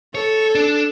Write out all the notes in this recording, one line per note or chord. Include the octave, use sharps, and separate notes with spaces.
A4 C#5
D4